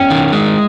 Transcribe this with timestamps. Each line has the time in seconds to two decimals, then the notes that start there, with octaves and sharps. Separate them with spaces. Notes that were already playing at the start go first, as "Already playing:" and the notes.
Already playing: C#4 G5
0.10 D#3
0.33 G#3